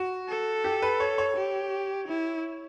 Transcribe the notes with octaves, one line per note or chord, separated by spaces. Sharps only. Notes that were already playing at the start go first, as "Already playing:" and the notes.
Already playing: F#4
A4
G4
B4
C#5
C#5
G4
E4